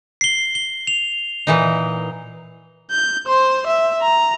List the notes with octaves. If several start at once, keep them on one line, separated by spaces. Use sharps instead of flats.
C7 G7
G7
F7
A#2 E3 D#4
G6
C5 C6
E5
A#5